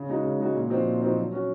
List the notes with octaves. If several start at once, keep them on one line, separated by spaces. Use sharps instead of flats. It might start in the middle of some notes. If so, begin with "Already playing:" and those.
Already playing: C#3
G#3 D#4 F#4
C#3
G#3 D#4 F#4
A#2
F3 C4 D#4 F#4
A#2
F3 C4 D#4 F#4
F#3
C#4 F#4